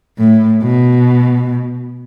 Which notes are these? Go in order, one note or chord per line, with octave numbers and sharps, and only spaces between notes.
A2
B2